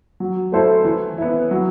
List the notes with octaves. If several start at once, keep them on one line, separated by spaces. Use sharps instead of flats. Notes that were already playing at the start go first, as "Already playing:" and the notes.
F#3
A3 E4 A4 C5
E3
B3 E4
F#3